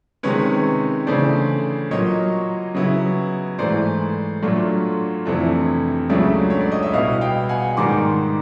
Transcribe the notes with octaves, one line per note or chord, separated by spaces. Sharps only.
C3 D#3 G#3 C#4 B4 C#5
C#3 E3 A3 D4 C5 D5
A#2 F#3 A#3 C#5 D#5
C#3 F#3 B3 E4
G#2 E3 A3 C5 D5
A#2 F#3 A3 D4 F4
F2 C3 E3 A3 D4
C#2 C#3 F#3 A3 D4 D5 E5
C#5
D5
D#5
E5
B2 G3 B3 E4 D#5 F5
F5 G5
F#5 G#5
G#2 D#3 G3 A#3 C6 D6